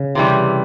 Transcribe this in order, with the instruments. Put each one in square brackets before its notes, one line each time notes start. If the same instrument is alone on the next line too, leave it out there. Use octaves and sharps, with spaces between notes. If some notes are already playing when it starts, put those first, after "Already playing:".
Already playing: [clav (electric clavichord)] C#3
[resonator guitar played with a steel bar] C3 E3 G3